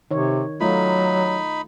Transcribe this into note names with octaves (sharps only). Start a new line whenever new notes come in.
C3 D#3 C#5
F#3 A3 D#4 F4 B5